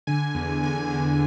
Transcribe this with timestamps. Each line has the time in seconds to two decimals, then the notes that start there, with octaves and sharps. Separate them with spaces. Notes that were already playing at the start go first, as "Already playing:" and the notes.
0.07 D3 G#5
0.35 E2
0.63 D3 G#5
0.90 D3 G#5